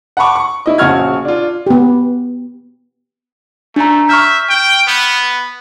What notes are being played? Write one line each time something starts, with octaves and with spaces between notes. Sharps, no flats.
F#5 A5 B5 C#6 D6
C#6
E4 D#5
A#1 C#3 F#4 C#6 F6 G#6
D4 F4
B3 G4
A3 D4 A#5
E5 C#6 F6 G6
G5
B3